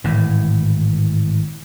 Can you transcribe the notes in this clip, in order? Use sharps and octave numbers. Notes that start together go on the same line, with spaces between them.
G#1 A2 E3